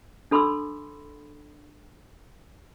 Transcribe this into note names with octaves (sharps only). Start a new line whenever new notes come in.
D4 A4 B5 C6 D6 E6